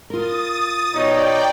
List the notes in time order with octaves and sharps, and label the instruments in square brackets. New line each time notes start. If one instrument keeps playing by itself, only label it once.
[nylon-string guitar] F4 A#4 [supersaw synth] D#6 A6
[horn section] B2 D#4 [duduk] C#5 [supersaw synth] D5 G5